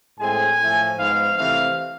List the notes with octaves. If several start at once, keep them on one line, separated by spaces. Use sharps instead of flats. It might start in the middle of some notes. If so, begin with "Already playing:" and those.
A2 G#3 C4 G#5
A2 F3 A3
G#2 F3 G#3 B3 F5
C3 E3 A3 C4 F5